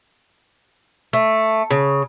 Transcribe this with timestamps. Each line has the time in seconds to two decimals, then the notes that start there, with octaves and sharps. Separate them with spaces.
1.13 A3
1.71 C#3